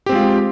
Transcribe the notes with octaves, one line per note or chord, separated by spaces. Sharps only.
G#3 C4 F4 G4